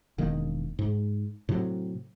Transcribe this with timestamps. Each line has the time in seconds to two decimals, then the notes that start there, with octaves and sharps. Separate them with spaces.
0.18 E1 D#3 A#3
0.79 G#2
1.49 A2 C3 F#3